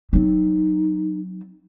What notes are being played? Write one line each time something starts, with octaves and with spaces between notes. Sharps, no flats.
F#3 C4 D#4